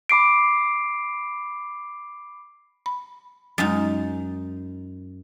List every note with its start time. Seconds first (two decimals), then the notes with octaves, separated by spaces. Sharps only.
0.09 B5 D6 C7 D7
2.86 B5
3.58 F#2 F#3 G#3 D#4 A6